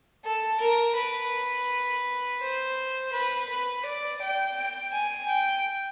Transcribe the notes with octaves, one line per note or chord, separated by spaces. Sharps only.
A4
A#4
B4
C5
B4
B4
D5
G5
G5
G#5
G5